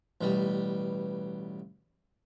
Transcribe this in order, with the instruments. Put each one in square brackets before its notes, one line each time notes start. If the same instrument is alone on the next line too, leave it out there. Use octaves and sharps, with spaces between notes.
[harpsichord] A1 B2 G3